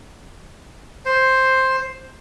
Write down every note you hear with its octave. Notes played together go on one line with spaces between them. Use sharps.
C5